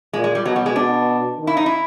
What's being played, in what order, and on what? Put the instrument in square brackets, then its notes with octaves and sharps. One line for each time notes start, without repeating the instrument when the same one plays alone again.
[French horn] A#2 [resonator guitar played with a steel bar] G#3
[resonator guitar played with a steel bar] G#3
G3
[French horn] B2 [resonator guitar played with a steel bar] F#3
[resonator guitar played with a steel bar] G3
G#3
[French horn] B2 [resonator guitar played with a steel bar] D4
[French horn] D#3
[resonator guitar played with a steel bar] E4
D#4
E4